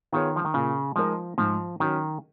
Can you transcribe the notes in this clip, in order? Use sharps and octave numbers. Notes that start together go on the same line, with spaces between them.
D#3 B3 F4 G#4 C#5
F3
D#3
A#2 C#3
F3 G#3 D#4 A#4
G#2 F3
D#3 F#3 C#4